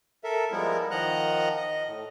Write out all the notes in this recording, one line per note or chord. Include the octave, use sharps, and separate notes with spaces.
A4 A#4 E5
F3 G3 G#3 B3 E4 A#4
D#3 F3 D#5 F#5 A#5 F#6
D#5
A2